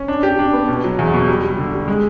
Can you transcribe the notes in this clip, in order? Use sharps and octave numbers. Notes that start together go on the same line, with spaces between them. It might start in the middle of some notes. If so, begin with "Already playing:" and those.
Already playing: C#4
D4
G4
D4
B3
B2
F#3
E2
B2
G3
G3
D3
G3
G#3